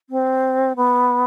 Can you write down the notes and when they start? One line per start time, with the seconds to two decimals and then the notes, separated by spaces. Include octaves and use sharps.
0.09 C4
0.76 B3